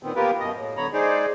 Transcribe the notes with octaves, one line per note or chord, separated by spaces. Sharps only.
A#2 D#3 B3 C4
A#3 B3 F4 G4 A#4 B4
F#2 B2 D#5
A2
D3 F#3 B3 C#5 A#5 B5
G#3 D#4 G#4 C5 D5